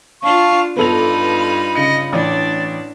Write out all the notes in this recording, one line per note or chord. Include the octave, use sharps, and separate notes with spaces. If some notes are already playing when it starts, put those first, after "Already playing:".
D4 F4 F5 A5 C#6
G2 B3 D#4 F4 A4 B5 F7
C#3 D#5 C#7
A1 D4 D5